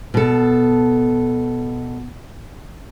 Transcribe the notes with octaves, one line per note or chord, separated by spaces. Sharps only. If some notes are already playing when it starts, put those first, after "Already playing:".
B2 A4